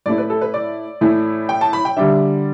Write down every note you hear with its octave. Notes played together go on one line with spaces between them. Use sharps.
A2 A3 E4 D5
B4
A4
B4
D5
A2 E3 A3 E4
G5
A5
B5
G5
D3 G3 D4 E5